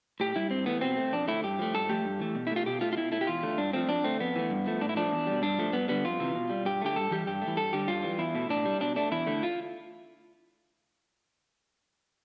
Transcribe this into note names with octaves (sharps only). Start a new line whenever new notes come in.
A2 G4
G3 E4
G2 C4
E3 A3 B3
B2 C4
A3
F2 D4
D3 A3 E4
G2 G4
F3 A3
G2 A4
F3 A3 G4
G2
E3 A3
B2
E4
A3 F4
B2 G4
A3 F4
F4
B2 E4
A3 E4
G4
E2 F4
D3 A3
G2 D4
F3 A3 C4
F2 D4
D3 A3 C4
F2 B3
E3 A3
G2
F3 A3
A2 D4
E4
F3 A3 D4
E2
B2 G3
G2 D4
F3 A3
G2 B3
D3 G3 B3
F2 F4
C3 E3
B2
G3
G2 G4
D3 A3 G4
G2 A4
E3 G3 G4
G2 G4
A3
E3
G2 A4
D3 G3 G4
G2 F4
E3 G3
E2 E4
B2 A3
A2 D4
G3
B2 D4
A3 D4
E2 E4
D3 A3
F4